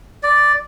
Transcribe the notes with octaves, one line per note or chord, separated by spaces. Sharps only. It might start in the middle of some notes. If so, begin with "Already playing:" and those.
D5